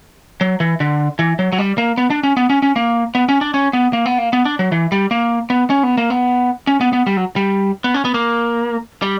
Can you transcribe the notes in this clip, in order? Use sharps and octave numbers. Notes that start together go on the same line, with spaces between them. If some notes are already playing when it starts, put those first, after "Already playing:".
F#3
E3
D3
E3
F#3
F#3
G3
A#3
B3
D4
C#4
B3
C#4
C#4
A#3
B3
C#4
D4
C#4
B3
A#3
B3
A#3
B3
D4
F#3
E3
G3
A#3
B3
C#4
B3
A#3
B3
C#4
B3
B3
G3
F#3
G3
B3
C#4
B3
A#3
G3